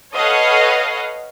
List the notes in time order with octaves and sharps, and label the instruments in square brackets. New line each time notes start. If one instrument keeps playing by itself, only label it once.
[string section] A4 B4 C#5 D#5 F5 F#5